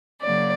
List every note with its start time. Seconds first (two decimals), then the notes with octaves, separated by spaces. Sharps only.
0.22 C#3 F#3 A#3 D5